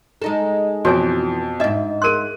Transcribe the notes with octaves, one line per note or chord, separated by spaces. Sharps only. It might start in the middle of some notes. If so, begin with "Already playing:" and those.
G#3 D#4 A4
F2 B2 E3 F#4 C#5 G#5
G#2 D4 D#5 E5
G#4 A#4 C6 F#6 D#7